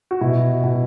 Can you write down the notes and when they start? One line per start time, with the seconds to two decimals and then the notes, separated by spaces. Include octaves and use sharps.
0.11 F#4
0.21 B2 E4
0.64 B2